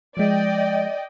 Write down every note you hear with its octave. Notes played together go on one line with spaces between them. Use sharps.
F3 G#3 D5 D#5 G5